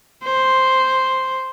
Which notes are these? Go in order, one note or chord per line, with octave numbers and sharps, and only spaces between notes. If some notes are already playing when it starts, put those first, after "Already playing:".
C5